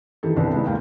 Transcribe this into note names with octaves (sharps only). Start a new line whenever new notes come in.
D#3 E3 G4 A4
C2 B3 D4
D#3 G#3 E4
D#2 F5 G5